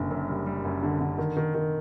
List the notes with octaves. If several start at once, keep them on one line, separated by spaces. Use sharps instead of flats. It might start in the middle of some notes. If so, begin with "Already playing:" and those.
Already playing: F#1 D3
F#2
G3
G3
F#2
D3
D3
D#3
D#3
D#3